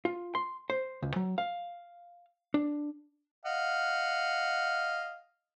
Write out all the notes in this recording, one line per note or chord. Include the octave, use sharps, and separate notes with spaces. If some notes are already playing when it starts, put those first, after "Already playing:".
F4
C6
C5
C#2
F#3
F5
D4
D#5 F5 F#5